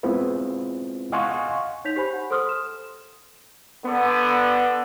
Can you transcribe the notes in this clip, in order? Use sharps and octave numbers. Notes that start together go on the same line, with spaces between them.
G#3 B3 C4 E4 F4 B4
D#5 F5 F#5 G#5 C6 C#6
D#4 C#5 G6 B6 F7
G4 C5 G#5 B5
F#5
A4 C5 C6 D#6 F6
E7
D3 B3